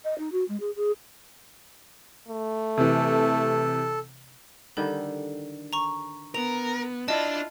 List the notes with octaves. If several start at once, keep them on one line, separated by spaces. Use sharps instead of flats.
D#5
D#4
F#4
G#3
G#4
G#4
A3
C3 E3 A4
D3 D#3 G3 A4
A#5 C#6
B3 A#4 F7
D4 E4 F4 D5 D#5 A5